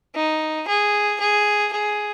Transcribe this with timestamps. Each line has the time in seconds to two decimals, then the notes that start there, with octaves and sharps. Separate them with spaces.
0.15 D#4
0.68 G#4
1.20 G#4
1.72 G#4